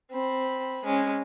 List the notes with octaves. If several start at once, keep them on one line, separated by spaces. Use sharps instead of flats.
C4 B5
G#3 C#4